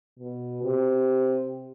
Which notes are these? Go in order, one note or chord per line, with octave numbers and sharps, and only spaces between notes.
B2
C3